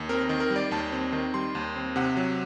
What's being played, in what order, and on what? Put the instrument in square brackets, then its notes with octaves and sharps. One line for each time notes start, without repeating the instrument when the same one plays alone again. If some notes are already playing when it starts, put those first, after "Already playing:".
Already playing: [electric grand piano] D#2
C4 A#4
D#3
A#4
G3
D5
D#2 A5
C4
D#3
G3 C6
D#2
C4
C3 F#5
F#3